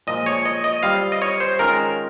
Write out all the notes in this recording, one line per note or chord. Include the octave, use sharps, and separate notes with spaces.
A#2 F3 G#3 D#5
C#5
D#5
D#5
G3 C4 F4 F5
D#5
C#5
C5
D#3 G#3 C#4 F4 A#4